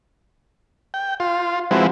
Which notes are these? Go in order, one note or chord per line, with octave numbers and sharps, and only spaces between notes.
G5
F4 C6
F3 G#3 C4 E4 F#4 B4